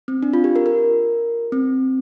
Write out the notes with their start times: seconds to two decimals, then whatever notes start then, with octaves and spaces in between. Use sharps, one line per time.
0.08 C4
0.23 D4
0.33 F4
0.44 G4
0.56 A#4
0.66 A#4
1.52 C4